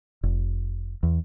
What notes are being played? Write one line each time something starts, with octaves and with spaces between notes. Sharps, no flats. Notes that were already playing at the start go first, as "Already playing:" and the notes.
F1
E2